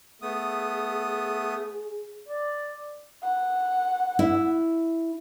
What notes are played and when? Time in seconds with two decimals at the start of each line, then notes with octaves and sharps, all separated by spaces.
0.22 A3 B3 G#4 D#6
2.29 D5
3.23 F#5
4.19 E4